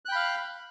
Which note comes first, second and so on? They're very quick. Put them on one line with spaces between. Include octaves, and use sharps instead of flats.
F#6 G5 B5 F5